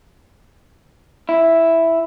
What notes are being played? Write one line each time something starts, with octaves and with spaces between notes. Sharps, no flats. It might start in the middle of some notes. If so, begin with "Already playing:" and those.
E4